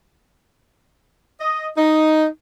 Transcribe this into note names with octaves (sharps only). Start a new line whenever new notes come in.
D#5
D#4